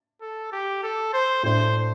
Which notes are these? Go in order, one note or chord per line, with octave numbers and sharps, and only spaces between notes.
A4
G4
A4
C5
A2 A3 D4 C5